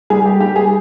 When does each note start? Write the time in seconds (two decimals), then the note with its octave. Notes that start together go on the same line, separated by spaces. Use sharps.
0.10 G3 G#4
0.26 G4
0.40 G3 G4
0.56 G#4